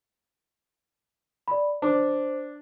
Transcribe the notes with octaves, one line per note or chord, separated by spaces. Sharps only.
D5 B5
D4 C5 D6